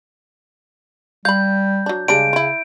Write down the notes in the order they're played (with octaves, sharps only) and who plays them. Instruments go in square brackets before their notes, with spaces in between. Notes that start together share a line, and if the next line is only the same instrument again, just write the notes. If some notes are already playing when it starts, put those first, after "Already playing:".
[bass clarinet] G3 [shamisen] F5 B5 [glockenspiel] G6
[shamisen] F#3 D4
[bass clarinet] C#3 [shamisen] G3 G#3 D4 [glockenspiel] D7
[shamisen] E4 F4